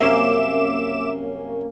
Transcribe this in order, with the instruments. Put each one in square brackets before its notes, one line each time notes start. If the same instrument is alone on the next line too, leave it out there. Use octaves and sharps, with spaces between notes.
[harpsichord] C2 F#2 C5 [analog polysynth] A#3 C#4 [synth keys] E5 D6 E7